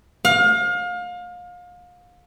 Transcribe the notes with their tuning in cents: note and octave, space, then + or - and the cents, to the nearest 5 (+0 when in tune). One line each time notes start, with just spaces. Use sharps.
F5 +30